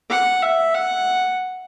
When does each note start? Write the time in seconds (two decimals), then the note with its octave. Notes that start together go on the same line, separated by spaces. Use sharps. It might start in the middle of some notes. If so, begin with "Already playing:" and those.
0.10 F#5
0.42 E5
0.74 F#5